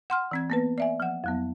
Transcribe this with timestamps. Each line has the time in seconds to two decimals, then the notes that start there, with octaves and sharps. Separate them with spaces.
0.10 F#5 C6 F6
0.31 E3 C4 G#6
0.50 A#3 B3 B4
0.78 D5 E5 G#5
1.00 F3 F#5
1.24 F2 F#3 B3